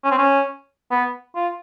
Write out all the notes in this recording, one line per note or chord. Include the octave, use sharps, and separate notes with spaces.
C#4
C4
C#4
B3
F4